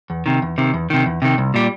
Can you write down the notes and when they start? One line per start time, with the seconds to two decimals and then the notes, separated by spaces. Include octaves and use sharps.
0.10 E2
0.26 C3 D#3
0.42 E2
0.58 C3 D#3
0.74 E2
0.90 C3 D#3
1.06 E2
1.22 C3 D#3
1.38 C2
1.54 A#2 G3